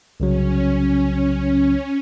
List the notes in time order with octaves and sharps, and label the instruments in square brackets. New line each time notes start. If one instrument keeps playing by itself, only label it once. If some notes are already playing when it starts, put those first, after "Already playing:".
[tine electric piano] C2 C#3 F#3 [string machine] C#4